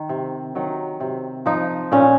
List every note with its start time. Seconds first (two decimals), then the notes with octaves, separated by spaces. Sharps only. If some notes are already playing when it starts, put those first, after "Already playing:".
Already playing: D#3
0.09 C3
0.55 D#3 F#3
1.00 C3
1.46 F3 D#4
1.92 A#2 C#4